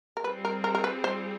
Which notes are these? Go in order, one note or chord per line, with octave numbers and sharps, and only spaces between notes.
A#4
G3 C4 F4 G#4 B4
A#4
A#4
A#4
B4
C5